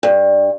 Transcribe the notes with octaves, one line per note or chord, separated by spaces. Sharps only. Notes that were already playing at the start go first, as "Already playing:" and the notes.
G2